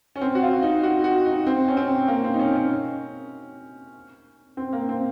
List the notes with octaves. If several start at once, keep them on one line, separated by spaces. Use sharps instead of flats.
C#4
C4
F#4
F4
D#4
F#4
F#4
D#4
C4
C#4
C4
A#3
C4
D#4
C#4
C#4
C4
A#3
C4